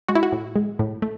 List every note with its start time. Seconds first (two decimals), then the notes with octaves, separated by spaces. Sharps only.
0.08 G#3 F#4
0.15 E4
0.23 F#4
0.32 A2
0.56 G#3
0.79 A2
1.02 A3